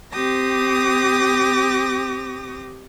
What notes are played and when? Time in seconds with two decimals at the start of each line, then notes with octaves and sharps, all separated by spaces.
0.12 C4 G4 D6 D#6 A#6